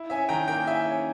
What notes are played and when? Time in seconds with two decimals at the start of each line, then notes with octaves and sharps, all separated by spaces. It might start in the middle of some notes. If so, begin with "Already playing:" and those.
Already playing: E4
0.10 C#4 E5 G#5
0.29 D#3 G5 A#5
0.48 A#3 G5 A#5
0.67 E4 E5 G#5
0.86 C#4